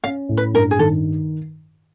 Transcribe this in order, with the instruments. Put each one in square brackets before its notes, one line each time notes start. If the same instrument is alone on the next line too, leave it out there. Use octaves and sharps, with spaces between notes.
[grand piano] C#4 [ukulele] F5
[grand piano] A2
[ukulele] B4
[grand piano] G2 [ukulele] A#4
[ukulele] G#4
[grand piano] D#3 [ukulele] A4